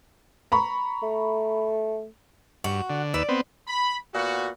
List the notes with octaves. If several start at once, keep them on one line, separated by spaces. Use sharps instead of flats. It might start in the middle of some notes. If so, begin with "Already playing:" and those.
A#5 B5 C#6
A3
G2 F#4
D3
D#2 B4 D5 E6
B3 C4
B5
A#2 B3 F#4